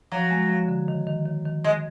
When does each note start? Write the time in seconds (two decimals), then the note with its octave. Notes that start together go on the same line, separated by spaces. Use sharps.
0.12 F3 F#3
0.30 G#3
0.50 F3
0.68 D3
0.88 D#3
1.07 D#3
1.26 D#3
1.46 D#3
1.64 D#3 G#3